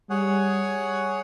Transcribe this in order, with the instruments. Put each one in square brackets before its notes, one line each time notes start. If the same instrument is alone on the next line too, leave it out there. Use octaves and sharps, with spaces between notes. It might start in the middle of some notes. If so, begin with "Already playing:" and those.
[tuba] G3 [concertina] G#4 C#5 F#5